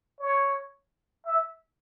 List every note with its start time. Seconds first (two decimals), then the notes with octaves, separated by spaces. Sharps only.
0.20 C#5
1.26 E5